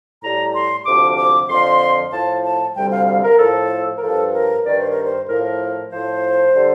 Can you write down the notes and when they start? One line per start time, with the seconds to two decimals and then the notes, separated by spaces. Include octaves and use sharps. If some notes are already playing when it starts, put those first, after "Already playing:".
0.23 A2 G3 A#5
0.54 C6
0.86 D2 C3 F3 D6
1.18 D6
1.49 F2 D3 F3 C6
2.12 A2 F3 A5
2.44 A5
2.76 D2 C3 G3 G5
2.92 F5
3.07 F5
3.23 A#4
3.39 A2 F3 A4
3.98 A#4
4.02 G2 F3 A4
4.34 A#4
4.66 G2 D#3 G3 D5
4.79 C5
4.92 A#4
5.05 C5
5.29 A2 F3 A#4
5.92 A2 F3 C5
6.56 D3 G3